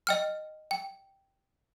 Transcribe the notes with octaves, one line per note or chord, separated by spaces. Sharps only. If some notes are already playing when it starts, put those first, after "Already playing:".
D#5 G5 F6
G5